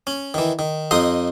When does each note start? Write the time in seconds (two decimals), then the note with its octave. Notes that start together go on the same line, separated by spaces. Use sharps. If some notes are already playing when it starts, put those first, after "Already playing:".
0.07 C#4
0.34 D#3 E3
0.59 D#3
0.91 F2 D#4 D#5 C6